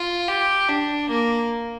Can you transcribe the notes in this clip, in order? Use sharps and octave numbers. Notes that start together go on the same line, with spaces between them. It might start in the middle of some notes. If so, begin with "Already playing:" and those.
Already playing: F4
G4
D4
A#3